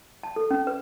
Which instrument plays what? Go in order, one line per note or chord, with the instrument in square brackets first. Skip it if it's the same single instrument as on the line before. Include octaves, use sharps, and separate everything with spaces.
[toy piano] A5
A4
C#4
B4